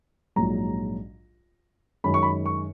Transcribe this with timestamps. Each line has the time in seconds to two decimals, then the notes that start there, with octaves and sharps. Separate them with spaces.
0.36 A#1 G#2 F#3 A#5
2.04 F#2 D#3 G#3 B5
2.14 C#6
2.22 B5
2.46 C#6